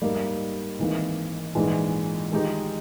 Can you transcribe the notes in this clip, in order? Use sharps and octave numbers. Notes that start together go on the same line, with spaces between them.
G#2 G3 A#3 D#4 A#4
G#1 G#2 E3 A#3
A#1 G#2 E3 G#3
D#3 G#3 D#4 G4